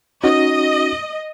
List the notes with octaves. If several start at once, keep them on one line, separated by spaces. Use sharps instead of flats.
C#4 D#4 F#4 D#5